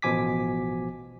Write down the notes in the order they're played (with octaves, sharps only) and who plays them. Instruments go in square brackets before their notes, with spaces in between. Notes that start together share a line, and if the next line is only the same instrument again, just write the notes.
[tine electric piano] A1 B2 F3 G#5 D6 B6